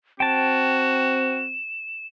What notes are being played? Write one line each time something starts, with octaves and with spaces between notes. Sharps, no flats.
C4 F#4 G5 A5 E7